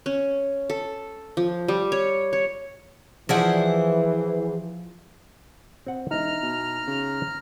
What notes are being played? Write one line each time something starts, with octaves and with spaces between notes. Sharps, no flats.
C#4
A4
F3
G3
C#5
C#5
E3 F3 E4 G#4 C5 D5 F#5
C4 F#5
E1 D#4 E4 A#5 F6
B2
C#3